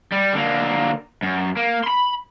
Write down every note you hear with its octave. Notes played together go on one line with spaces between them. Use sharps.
G3
D3 A#3
F#2
A#3
B5 C6